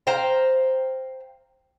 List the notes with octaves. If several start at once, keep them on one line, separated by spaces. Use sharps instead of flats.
C5 F5 G5 A#5